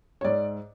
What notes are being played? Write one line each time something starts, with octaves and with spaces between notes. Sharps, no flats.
C#5
G#2 D5